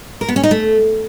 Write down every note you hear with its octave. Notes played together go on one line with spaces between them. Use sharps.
A#4
B3
C#4
D#4
A3